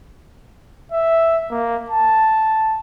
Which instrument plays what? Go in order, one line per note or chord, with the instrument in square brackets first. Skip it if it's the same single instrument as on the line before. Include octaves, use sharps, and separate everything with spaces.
[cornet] E5
A#3
A5